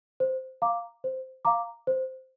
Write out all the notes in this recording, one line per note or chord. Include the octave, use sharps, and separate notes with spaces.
C5
F5 A#5 D6
C5
F5 A#5 D6
C5